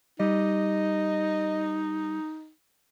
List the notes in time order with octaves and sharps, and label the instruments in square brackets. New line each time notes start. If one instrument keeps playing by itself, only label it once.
[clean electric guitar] G3 [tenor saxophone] D#4 [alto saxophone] D#5